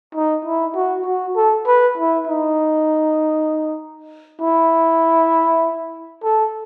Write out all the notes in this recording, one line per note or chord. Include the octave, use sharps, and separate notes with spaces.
D#4
E4
F#4
F#4
A4
B4
E4
D#4
E4
A4